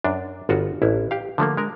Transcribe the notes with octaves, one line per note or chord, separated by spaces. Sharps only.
F#2 D4
G1 F4 F#4
A1 E4
G4 F5
D3 F3 A3 A#3
G#3 A#4